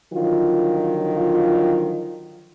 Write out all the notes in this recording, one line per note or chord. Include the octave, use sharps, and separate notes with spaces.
D3 D#3 F3 F#3 F4